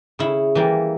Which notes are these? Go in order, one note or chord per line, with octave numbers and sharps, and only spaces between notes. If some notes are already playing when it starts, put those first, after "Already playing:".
C#3 E4
E3 G3 A#3